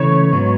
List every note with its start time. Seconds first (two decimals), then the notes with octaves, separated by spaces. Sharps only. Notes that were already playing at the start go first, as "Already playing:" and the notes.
Already playing: C#3 E3 A3 C#5
0.32 G#2 F#3 B3